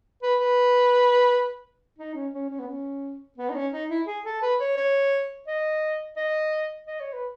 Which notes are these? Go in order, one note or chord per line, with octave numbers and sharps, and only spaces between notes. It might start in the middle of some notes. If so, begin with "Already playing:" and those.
B4
B4
D#4
C#4
C#4
C#4
B3
C#4
B3
D#4
C#4
D#4
E4
G#4
A4
B4
C#5
C#5
D#5
D#5
D#5
C#5
B4